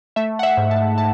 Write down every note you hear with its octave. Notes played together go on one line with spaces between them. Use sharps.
A3 E5
F#5
E5
G#2
A5
A5